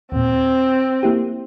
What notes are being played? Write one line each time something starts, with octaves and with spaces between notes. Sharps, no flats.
D#2 A#2 C4
A#3 E4 G4